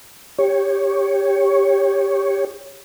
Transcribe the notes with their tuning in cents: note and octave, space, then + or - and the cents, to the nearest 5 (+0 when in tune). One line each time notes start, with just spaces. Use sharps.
G4 +15 C#5 +0